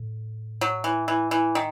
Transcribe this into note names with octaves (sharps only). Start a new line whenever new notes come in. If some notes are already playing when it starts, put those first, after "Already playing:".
Already playing: A2
F#3
E3
E3
E3
D#3